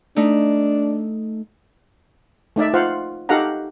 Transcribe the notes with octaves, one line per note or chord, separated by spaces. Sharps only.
A3 D4 D#4
A3 D#4 D5 E5
F4 C5 F5 F#5
D#4 G4 A4 F5 F#5 A#5